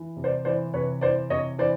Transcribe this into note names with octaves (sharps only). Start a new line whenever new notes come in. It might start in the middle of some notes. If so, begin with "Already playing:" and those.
Already playing: E3
C3
C5 D5
E3 C5 D5
C3 B4 C#5
E3 C5 D5
C3 C#5 D#5
E3 C5 D5